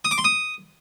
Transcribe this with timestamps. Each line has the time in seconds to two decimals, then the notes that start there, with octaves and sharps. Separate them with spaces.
0.05 D#6
0.11 D6
0.18 C6
0.24 D#6